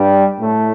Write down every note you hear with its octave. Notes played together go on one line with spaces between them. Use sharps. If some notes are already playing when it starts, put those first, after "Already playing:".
Already playing: G2 G3
A2 A3